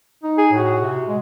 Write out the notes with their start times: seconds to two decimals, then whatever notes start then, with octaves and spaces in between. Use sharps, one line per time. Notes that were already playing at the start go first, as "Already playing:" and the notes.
0.23 D#4
0.38 G#4
0.53 A2 F#4
0.79 C3
1.08 G#3